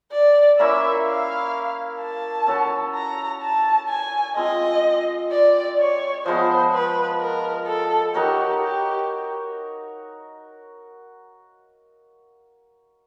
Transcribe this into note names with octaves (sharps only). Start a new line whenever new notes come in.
D5
A#3 C#4 E4 E5
F5
A5
C#4 F#4 A4 C#5
A#5
A5
G#5
G#3 C4 F4 D#5
D5
C#5
F3 G#3 B3 C5
B4
A#4
A4
D#4 F#4 G4 A#4 C#5
G4